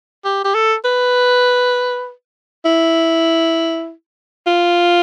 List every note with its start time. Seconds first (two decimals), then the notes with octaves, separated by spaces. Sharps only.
0.24 G4
0.44 G4
0.54 A4
0.85 B4
2.65 E4
4.47 F4